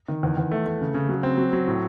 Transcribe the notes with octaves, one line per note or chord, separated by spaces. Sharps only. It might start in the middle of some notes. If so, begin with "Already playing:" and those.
D#3
E2
E2
A3
A3
C#3
C#3
F#3
C4
F#3
F#3
A2